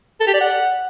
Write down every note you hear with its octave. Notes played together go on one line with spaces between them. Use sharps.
A4
G4
D5
F#5